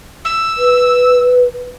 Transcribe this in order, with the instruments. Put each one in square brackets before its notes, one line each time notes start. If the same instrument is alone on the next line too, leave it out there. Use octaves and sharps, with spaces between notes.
[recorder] E6
[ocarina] B4